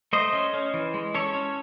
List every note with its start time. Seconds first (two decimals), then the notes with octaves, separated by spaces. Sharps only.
0.13 A3 C5 D#5
0.33 C#4
0.54 C#4
0.74 E3
0.94 G#3
1.14 C#4 A4 C#5
1.35 C#4